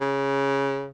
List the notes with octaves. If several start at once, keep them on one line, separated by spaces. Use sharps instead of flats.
C#3